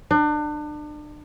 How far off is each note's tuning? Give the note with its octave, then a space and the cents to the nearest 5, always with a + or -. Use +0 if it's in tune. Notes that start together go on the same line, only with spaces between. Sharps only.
D4 +35